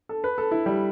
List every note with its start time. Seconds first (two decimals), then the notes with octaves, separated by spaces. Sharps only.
0.09 A4
0.24 B4
0.38 A4
0.51 E4
0.66 G3